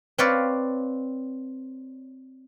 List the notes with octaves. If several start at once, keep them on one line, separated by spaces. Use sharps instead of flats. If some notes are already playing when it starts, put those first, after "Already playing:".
C4 B4 C#5 D5 F5